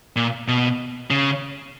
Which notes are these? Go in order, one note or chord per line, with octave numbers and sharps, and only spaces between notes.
A#2
B2
C#3